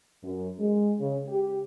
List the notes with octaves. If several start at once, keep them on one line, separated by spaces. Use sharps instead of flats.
F#2
G#3
C#3
G4